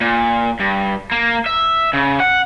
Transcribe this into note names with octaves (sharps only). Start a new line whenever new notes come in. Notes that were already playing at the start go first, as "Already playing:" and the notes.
A#2
G2
A#3
E5
C#3
F#5